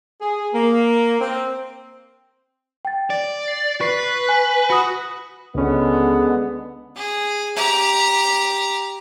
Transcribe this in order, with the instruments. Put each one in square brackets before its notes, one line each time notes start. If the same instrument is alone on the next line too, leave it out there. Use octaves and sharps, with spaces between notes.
[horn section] G#4
A#3
C4
[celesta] G5 A6
[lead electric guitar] D5
[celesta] C7
[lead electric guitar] B4 [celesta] C#6 C7
[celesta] G#5
[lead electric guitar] F#4 [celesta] B5 D#6
[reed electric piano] C#2 C#4 [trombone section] D3 G#3 B3
[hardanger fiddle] G#4
G4 A#5